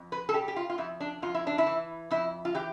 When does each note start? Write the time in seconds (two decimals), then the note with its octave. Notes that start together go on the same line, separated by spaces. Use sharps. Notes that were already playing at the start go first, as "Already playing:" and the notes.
Already playing: F2
0.12 B4
0.29 A4
0.33 G3 G4
0.48 G4
0.56 F4
0.70 F4
0.78 F2 E4
1.00 D4
1.22 F2 F4
1.34 E4
1.47 D4
1.58 E4
1.67 E3
2.11 F2 E4
2.45 F4
2.54 E3 G4